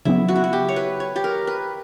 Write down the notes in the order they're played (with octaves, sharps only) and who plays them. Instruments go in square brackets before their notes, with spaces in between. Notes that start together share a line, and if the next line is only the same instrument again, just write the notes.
[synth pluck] C#3 F#3 B3 [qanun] E4
[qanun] F#4
E4
F#4
G4
C#5
B4
C#5
G4
A#4
B4